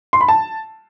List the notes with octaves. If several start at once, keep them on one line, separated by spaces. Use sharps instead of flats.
C6
B5
A5